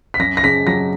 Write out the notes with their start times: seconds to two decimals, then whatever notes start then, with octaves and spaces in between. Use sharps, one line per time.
0.14 B6
0.19 F#2 A#6
0.37 A#6
0.43 C#3 B6
0.67 F#3 A#6